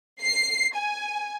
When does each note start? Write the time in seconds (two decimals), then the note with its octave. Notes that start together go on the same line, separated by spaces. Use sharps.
0.22 C7
0.75 G#5